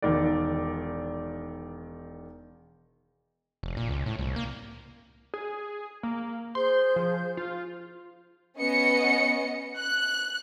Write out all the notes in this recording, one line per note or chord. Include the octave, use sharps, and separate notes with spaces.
E1 D#3 D5
F1
A#2
C#2
A2
C2
A#3
G#4
A#3
G#4 C5 C6 G6
F3
F4
B3 C#4 D#5 C#7
F#6